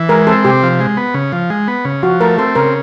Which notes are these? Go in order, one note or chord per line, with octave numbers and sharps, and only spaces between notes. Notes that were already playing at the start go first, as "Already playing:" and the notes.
Already playing: E3
G#3 A#4
C4 A4
C3 G4
F3
G#3
B3
C#3
F3
G#3
B3
C#3
F3 F#4
A3 A#4
C4 A4
C#3 A#4